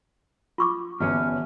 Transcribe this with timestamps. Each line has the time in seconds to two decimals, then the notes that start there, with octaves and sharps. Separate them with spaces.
0.58 F4 C#6 D6
1.00 G1 E2 F#3 C#4 F6